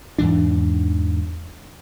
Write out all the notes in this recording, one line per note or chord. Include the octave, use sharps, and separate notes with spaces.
E2 G#2 E3 D4